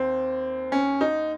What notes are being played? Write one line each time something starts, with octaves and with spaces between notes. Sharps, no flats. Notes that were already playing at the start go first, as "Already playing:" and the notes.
Already playing: D#2 C4
C#4
D#4